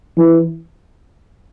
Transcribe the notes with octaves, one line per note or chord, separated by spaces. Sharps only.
E3